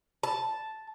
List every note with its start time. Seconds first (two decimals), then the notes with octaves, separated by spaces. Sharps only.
0.23 A5